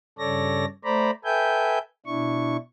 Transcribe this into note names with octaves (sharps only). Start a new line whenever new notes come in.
G2 C#3 A4 C#5 D5 A#6
A3 C5 D5 A#5 B5
A4 B4 E5 G5 G#5 G6
B2 D4 E4 C#6